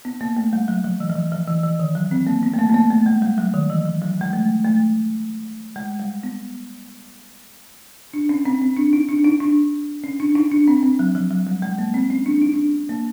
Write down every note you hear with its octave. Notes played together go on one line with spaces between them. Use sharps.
B3
A#3
A3
G3
F#3
F3
E3
F3
E3
F3
E3
E3
D#3
F#3
C4
A#3
B3
A3
A#3
B3
A#3
A3
G#3
G3
F#3
D#3
E3
F3
F#3
G#3
A3
A3
G#3
G3
B3
D4
C#4
C4
C4
D4
D#4
D4
D#4
D4
C#4
D4
D#4
D4
C4
C4
F#3
F3
F#3
G3
G#3
A#3
C4
C#4
D4
D#4
D4
A#3